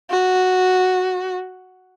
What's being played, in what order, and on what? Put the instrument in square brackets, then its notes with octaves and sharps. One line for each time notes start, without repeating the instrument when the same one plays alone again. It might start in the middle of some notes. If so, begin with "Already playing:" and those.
[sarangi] F#4